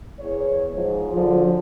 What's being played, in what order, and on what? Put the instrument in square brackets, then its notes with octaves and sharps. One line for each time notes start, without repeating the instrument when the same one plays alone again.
[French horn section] E2 C#5
G#2 F3
D3 F3 F#3 D4